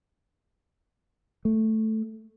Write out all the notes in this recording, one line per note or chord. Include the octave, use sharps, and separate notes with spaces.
A3